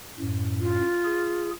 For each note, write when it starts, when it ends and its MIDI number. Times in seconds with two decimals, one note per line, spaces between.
0.20 0.80 42
0.20 0.80 45
0.60 1.51 65
1.05 1.51 68